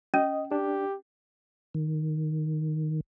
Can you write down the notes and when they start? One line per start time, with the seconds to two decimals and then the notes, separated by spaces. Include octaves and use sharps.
0.14 C#4 D#5
0.52 D4 G4
1.74 D#3